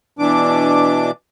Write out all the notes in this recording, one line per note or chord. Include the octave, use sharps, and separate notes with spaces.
B2 E3 D4 D6